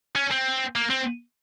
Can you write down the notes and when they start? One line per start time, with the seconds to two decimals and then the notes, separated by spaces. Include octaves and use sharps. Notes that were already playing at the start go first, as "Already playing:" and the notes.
0.16 C#4
0.31 C4
0.76 A#3
0.90 C4